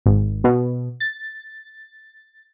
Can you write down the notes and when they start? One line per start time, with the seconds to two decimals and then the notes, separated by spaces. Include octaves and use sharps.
0.06 G#1
0.44 B2
1.00 A6